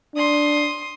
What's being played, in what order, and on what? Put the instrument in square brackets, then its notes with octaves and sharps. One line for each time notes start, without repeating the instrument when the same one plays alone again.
[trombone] D4 [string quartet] C6 D#6